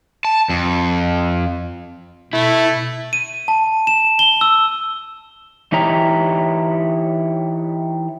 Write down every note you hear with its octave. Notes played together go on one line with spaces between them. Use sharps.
A5
F2
B2 A3 E4
D#7
A5
E7
G7
E6
E3 D#4 E4 G4 C#5 A#5